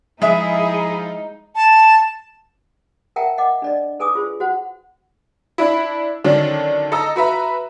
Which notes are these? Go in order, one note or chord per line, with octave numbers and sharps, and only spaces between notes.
F3 G#3 D#4 E4 G#4 E5
A5
A#4 E5 F#5 G5 A5 A#5
D#5 F#5 D6
D4 D5 D#5
D#4 A4 B4 G#5 D6 D#6
F4 G#4 C5
F#4 C5 F#5
D4 E4
D3 D#3 F#3 C#4 D4
A4 D#5 A#5 E6
F#4 B4 E5 A#5